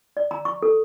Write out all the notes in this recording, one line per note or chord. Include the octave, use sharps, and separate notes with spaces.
D5
A#5
C#6
A4